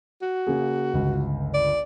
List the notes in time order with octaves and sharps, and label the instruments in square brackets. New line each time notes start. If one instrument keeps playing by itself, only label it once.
[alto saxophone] F#4
[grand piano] C#3 A#3 G#4
G1 C#2
[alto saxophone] D5